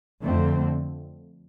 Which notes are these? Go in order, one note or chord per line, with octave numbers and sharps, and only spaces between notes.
F2 D3 A3 C4